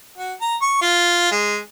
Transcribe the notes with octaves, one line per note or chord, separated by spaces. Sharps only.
F#4
A#5
C#6
F4
G#3